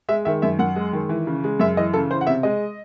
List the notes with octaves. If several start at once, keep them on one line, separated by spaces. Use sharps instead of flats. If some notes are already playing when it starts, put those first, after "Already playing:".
G#3 E5
D#3 E5
F#2 E5
F#2 F#5
G#3
D#3
E3
C#3
G#3
F#2 E5
E3 D#5
C#3 A4
E3 C5
F#5
C3 E5
G#3 D#5